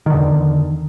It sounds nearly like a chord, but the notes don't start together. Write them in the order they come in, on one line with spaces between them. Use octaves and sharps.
D#3 D3 E2